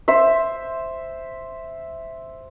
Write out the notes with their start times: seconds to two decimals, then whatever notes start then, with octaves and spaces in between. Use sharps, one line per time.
0.08 C5 E5